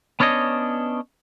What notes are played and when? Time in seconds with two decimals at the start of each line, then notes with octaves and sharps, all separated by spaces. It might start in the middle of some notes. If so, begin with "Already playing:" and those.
0.20 B3 C#4 D4 C#5 D#5